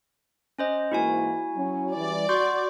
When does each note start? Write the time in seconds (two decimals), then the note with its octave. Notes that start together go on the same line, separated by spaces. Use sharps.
0.59 C#4 C5 D#5
0.92 G#2 E3 A#3 E4 F#4 G#5
1.56 F#3 C#4
1.96 E3 G3 D5
2.29 F#4 C6 C#6 G6